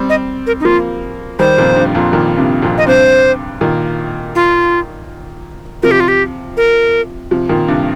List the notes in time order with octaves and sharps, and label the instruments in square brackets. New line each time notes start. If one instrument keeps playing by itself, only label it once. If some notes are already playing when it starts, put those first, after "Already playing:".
Already playing: [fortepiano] G3 C4
[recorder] D#5
A#4
D#4
[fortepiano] F3 A#3 [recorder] F4
[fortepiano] D#3 G3 [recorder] C5
[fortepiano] F2 A#2
G2
F2 A#2
A#2 D#3
G2 C3
F2 A#2
[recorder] D#5
[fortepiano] G2 C3 [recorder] C5
[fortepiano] A#2 D#3
[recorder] F4
[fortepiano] C3 F3 [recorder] A#4
[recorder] G4
F4
G4
A#4
[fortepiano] C3 F3
A#2 D#3
G2 C3